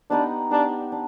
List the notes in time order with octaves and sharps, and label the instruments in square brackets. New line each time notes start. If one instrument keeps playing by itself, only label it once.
[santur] B3 D#4 G4 B4 [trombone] D4
[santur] B3 D#4 G4 B4 [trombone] D4
[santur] D4